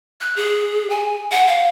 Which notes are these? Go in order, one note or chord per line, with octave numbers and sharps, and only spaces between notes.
F#6
G#4
G#5
F#5
F5